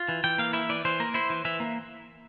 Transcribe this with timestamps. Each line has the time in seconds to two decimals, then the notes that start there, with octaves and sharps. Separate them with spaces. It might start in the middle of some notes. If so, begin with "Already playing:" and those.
Already playing: F4
0.09 E3
0.24 E3 G5
0.38 A#3 F5
0.53 E4 E5
0.69 E3 D5
0.85 E3 C5
1.00 A#3 A#4
1.14 E4 C5
1.30 E3
1.45 E3 E5
1.60 A#3